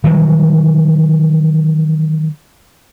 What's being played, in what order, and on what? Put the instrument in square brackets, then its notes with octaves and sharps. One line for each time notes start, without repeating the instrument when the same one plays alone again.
[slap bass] D#3 E3 F#3 G3